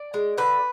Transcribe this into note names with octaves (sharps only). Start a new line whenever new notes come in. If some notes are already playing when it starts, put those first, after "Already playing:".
Already playing: D5
G#3
D3 B4